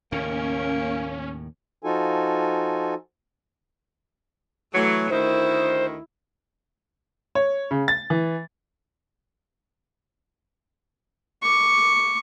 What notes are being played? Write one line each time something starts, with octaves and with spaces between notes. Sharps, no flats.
D#2 A2 C#3 A#3 C#4
F3 D#4 F4 F#4 A4 G#5
E3 F#3 A3
D2 D#3 E4 C5
C#5
C#3
A6
E3
C#6 D6